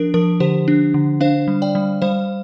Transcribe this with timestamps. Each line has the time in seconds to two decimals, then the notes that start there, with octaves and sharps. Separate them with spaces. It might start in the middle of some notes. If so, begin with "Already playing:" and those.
Already playing: F3 D4 A#4
0.14 F3 A#4
0.40 D3 G4 C5
0.68 D4
0.94 D3
1.20 D4 C5 F5
1.48 G3
1.62 D5 G5
1.75 G3
2.02 G3 C5 F5